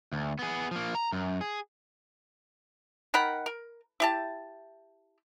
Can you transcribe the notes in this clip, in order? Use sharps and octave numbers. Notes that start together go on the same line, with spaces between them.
D2
B3 G#4
F3 A#3
A#5
F#2
G#4
D#3 A#4 F#5 B5
A#4
E4 G4 A5